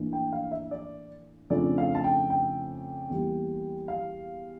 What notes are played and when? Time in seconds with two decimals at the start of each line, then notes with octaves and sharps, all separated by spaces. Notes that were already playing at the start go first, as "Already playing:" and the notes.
Already playing: A2 E3 A#3 D4
0.13 G5
0.32 F5
0.51 E5
0.71 D5
1.50 F2 C#3 F3 A3 D4 D5
1.78 F5
1.95 A5
2.04 G5
2.30 G5
3.10 E2 E3 G3 A#3
3.88 F5